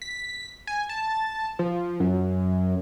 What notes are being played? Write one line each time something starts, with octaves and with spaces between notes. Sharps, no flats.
B6
G#5
A5
F3
F#2